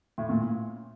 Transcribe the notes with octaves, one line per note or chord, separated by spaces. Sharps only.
A2
A#2